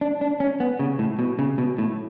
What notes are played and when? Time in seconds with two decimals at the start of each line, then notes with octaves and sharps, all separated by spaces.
0.01 D4
0.21 D4
0.40 C#4
0.60 B3
0.79 C#3
0.99 A2
1.19 B2
1.39 C#3
1.58 B2
1.78 A2